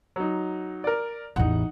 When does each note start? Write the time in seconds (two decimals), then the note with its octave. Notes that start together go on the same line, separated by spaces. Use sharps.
0.16 F#3 D#4
0.84 A#4 D5
1.36 A1 E2 D#4 F#5